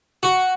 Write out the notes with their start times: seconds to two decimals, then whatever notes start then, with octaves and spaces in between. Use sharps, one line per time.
0.23 F#4